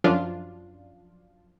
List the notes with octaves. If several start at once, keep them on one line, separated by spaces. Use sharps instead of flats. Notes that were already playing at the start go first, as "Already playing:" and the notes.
F#2 F3 D4 F4